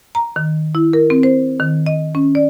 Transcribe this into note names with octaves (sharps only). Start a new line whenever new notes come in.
A#5
D#3
E4
A#4
C4
C5
D#3
D#5
C#4
D5